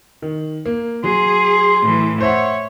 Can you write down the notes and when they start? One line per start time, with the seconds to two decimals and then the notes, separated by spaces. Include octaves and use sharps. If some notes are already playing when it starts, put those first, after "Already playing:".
0.22 D#3
0.66 A#3
1.04 F#3 G#4 C6
1.82 A2 E3
2.21 C5 C#5 E5 F#5